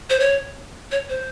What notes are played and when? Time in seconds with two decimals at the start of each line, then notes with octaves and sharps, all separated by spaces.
0.10 C5
0.20 C#5
0.92 C#5
1.09 C5